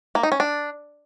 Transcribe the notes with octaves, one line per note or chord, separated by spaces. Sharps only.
A#3
D#4
C#4
D4